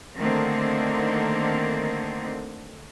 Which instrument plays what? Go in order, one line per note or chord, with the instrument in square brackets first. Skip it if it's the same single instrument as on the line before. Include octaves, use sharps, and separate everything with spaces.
[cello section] D3 D#3 A3 A#3 C4